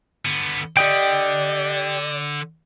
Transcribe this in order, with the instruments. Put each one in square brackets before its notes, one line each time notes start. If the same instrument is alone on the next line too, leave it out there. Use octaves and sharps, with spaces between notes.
[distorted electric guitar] D3 B3
[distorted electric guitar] D3 [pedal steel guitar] G4 D#5 G5 [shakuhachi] D5